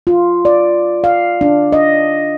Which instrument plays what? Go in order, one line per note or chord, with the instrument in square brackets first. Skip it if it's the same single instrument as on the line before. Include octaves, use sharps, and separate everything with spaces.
[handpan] F4
D5
F5
D4
D#5